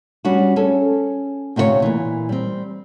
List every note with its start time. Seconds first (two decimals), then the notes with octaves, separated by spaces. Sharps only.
0.25 G3 C#4 D4 F#4
0.56 C#4 G#4 A4
1.56 D2 C3 F4 G4 C#5
1.82 A#2 E3
2.29 G3 C4